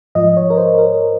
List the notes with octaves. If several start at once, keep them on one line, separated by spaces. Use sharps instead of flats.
G#2 F3 D#5
C#5
A#4
C5
A#4